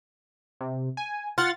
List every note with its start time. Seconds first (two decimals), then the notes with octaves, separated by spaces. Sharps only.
0.61 C3
0.97 G#5
1.38 F4 F#5 A6